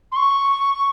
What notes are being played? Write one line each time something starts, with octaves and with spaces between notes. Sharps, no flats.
C6
C#6